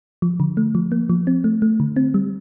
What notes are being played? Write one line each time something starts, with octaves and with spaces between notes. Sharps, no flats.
F3
D3
A3
F3
A#3
F3
C4
A3
A3
D3
C4
G3